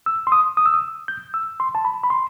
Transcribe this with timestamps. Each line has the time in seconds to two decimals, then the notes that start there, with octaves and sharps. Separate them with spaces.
0.06 E6
0.27 C6
0.32 D#6
0.57 D#6
0.66 E6
0.74 D#6
1.08 G6
1.34 E6
1.60 C6
1.75 A5
1.85 B5
2.04 B5
2.10 C6